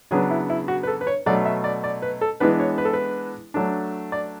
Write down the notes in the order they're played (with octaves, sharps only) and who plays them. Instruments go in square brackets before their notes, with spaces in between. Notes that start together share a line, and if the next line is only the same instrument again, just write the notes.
[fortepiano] C#3 F#3 B3 D4 G#4
E4
E4
F#4
B4
A4
B4
C#5
B2 F#3 A3 D5
E5
D5
D5
B4
A4
E3 G#3 B3 D4 B4
C#5
B4
A4
B4
F#3 A3 D4
D5